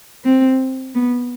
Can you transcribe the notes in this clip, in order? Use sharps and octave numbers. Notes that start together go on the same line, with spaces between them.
C4
B3